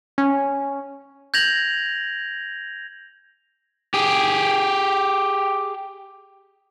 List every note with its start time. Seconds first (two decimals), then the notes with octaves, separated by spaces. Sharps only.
0.18 C#4
1.34 G6 G#6 A#6 F7 F#7
3.94 G4 G#4